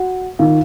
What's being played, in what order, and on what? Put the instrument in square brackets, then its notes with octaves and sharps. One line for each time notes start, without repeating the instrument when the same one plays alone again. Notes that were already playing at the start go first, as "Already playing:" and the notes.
Already playing: [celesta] F#4 F#5
[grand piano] D#3 [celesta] F4 F5